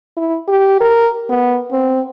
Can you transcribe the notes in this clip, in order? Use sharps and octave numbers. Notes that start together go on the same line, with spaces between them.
E4
G4
A#4
B3
C4